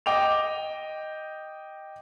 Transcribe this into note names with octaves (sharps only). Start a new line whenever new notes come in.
D#5 G5 D6 F7